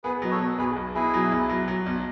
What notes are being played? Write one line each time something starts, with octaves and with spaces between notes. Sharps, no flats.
B3 G#4 B4
F#3 D#5
A4 C#5
B2
B1 G#4 B4
B1
B2 E4 G#4
F#3
B1
F#3
F#3
B1